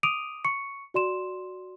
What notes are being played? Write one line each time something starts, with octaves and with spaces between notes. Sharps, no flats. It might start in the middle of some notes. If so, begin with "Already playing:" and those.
D6 D#6 D7 D#7 F7
C#6 C#7
F#4 D5 C6 E7